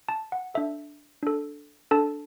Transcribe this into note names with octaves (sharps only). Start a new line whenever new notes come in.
A5
F#5
D4 A4 E5
D4 A4
D4 A4 A5